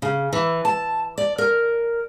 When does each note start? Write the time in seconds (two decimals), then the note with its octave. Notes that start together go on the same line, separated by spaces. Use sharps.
0.02 C#3
0.33 E3
0.65 A5
1.18 D5
1.38 A#4